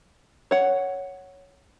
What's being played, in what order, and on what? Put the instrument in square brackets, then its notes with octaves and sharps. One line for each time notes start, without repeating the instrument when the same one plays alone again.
[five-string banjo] C#5 F#5